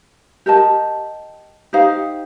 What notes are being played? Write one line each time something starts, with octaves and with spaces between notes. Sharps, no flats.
G4 A#4 D#5 A5
D#4 G4 C5 F5